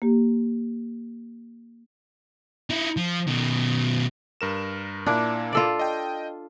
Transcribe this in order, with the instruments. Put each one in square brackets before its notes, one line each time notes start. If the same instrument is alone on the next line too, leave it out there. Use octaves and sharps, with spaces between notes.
[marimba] A#3 G4
[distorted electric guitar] D#4 E4
F3
B2 D#3
[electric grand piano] G2 A#4 E7
[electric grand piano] A#2 A#3 E4 [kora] D4
[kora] F4 A4 D5
[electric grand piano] D#5 G5